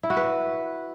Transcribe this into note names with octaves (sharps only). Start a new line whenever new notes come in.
E4
F#4
B4